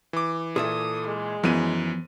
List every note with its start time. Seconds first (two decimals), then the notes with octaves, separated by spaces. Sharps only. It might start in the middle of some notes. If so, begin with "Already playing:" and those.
0.13 E3 D6
0.56 A#2 G#4 A4 E5 D#6
1.06 G#3
1.43 F#2 E3 F3 B3 D#7